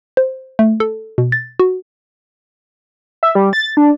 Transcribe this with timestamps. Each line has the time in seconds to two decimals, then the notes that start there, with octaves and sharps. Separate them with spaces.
0.17 C5
0.59 A3
0.80 A4
1.18 B2
1.32 A6
1.60 F#4
3.23 E5
3.35 G3
3.53 A6
3.77 D4